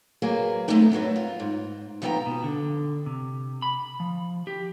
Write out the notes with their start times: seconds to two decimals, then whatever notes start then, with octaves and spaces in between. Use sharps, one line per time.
0.22 F#3 A#3 G#4 B4
0.68 G#3 A3 B3 C4 D4 D#4
0.92 F#2 F#3 B3 D4
1.16 F4
1.40 G#2
2.02 D#2 F3 B3 E5 G5 A#5
2.26 B2
2.44 D3
3.06 C3
3.62 B5
4.00 F3
4.47 G4